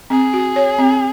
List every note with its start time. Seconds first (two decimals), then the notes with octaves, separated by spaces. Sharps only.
0.10 C4 G#4
0.33 F#4
0.56 C#5
0.78 C4